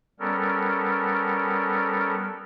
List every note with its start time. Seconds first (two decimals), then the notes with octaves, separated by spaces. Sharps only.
0.20 G3 B3 C#4 A4 A#4